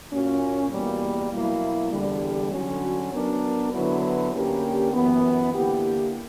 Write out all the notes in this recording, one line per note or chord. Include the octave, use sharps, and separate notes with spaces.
A#2 A#3 C#4 F#4
E2 B2 G3 A#3
B2 F#3 A#3 E4
E2 D3 G3
D3 F#3 C#4 F#4
F#3 B3 D4 A#4
D3 F#3 B3 E4 B4
D3 A#3 C#4 G4 A#4
F#2 E3 B3
D3 A#3 E4 G4